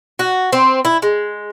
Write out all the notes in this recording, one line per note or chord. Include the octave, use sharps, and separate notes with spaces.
F#4
C4
E4
G#3